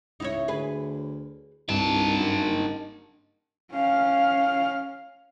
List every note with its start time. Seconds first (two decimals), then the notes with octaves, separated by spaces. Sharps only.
0.20 C#2 D#4 E4 C#5
0.48 D2 G#4 B4
1.69 C2 G2 D#3 A5
2.19 F#2
2.46 F#1
3.73 C#4 F5